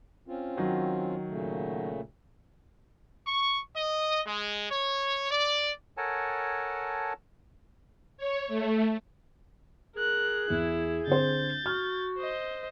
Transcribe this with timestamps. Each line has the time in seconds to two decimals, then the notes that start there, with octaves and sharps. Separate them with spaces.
0.28 C4 C#4 F4
0.57 D#3 F#3 F#4
1.28 A#2 C#3 A3
3.26 C#6
3.73 D#5
4.25 G#3
4.68 C#5
5.30 D5
5.97 A4 A#4 C#5 F#5 G#5 A5
8.17 C#5
8.48 A3
9.96 G#4 A#4 F#6
10.50 E2 E4
11.07 D3 C4 C5 G6 A6
11.66 F#4 F6
12.18 C5 D#5